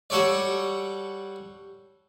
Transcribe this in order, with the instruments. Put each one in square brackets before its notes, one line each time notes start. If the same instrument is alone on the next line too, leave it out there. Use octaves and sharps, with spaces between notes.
[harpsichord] G3 F#4 A4 C#5 D5